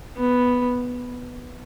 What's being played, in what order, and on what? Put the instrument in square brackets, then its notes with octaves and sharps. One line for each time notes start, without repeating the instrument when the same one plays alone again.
[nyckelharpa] B3